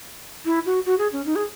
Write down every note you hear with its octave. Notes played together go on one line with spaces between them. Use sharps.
E4
F#4
F#4
G#4
C#4
D#4
G#4